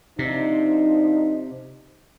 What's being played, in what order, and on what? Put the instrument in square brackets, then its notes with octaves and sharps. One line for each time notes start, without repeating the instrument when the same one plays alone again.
[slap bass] C3 [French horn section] F3 D4 D#4